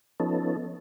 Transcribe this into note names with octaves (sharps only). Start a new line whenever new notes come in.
F3 B3 C#4 D#4 A4